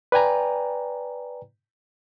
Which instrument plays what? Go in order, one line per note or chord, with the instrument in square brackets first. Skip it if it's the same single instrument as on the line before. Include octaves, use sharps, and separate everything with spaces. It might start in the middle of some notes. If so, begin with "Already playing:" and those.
[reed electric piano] B4 D5 G5 G#5 A#5